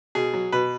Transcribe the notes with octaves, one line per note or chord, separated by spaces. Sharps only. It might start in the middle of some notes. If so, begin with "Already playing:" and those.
B2 G#4
F#3
B2 B4